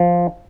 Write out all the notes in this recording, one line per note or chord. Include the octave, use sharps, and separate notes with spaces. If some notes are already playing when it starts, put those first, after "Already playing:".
Already playing: F3